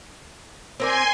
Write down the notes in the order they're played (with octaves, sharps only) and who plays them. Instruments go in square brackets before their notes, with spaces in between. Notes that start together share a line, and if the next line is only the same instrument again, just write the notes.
[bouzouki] C4 A#4 D5 [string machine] G#5 C6